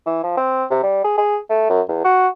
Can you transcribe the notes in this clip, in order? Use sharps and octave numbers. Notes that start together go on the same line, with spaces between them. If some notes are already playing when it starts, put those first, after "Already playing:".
E3
F3
C4
C3
G3
G#4
G#4
A3
F#2
E2
F#4